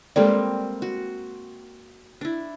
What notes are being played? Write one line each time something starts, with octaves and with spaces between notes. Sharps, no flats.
G3 G#3 A#3 C4 A4 D5
F#4
D4 E4